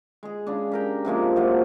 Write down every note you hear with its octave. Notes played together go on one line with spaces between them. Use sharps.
G#3 G#4
C#3 G#3 D4
G4 A#4 G5
C3 F3 G#3 A#3
C3 F3 F#3